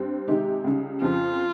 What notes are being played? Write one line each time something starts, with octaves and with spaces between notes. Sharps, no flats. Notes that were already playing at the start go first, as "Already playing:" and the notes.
Already playing: G2 G3 C4
C3 D#3 G#3 D#4 G4
C#2 C#3 G3
F2 C#3 F3 F4